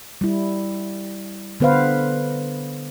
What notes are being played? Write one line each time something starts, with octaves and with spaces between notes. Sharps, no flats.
G3 E4
D3 B3 B4 C5 F5